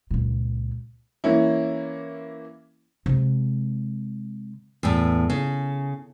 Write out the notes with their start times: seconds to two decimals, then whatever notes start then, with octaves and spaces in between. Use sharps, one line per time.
0.11 C#2 A#2
1.24 E3 A#3 C#4 E4
3.06 C3 G#3
4.83 E2 A2
5.30 C#3